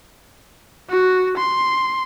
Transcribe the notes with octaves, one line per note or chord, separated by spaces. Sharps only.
F#4
C6